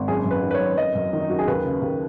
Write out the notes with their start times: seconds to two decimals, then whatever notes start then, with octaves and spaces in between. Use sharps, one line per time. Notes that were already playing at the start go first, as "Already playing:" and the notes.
Already playing: G#1
0.08 F#1 G#4
0.25 F#2
0.31 B4
0.43 D#3
0.51 B4
0.55 C#5
0.60 F#1
0.77 F#1 D#5
0.95 F#2
1.13 D#3
1.21 D#4
1.30 F#1 F#4
1.39 G#4
1.47 D#2 B4
1.64 C#3
1.82 D#2